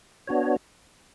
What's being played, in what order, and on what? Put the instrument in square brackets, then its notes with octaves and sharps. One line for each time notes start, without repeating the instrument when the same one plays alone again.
[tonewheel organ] B3 D4 F#4 C#5